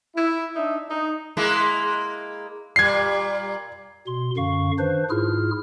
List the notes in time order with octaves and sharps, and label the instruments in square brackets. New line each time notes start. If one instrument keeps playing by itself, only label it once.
[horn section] E4
D4 D#4 E5
D#4
[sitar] G#3 A#3 E4
[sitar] A#2 G3 [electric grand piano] G#6 C7
[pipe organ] B2 C6
F#2 D3 F5 C#6
D#3 D4 B4 C5
G#2 E4 F4 G#4 F6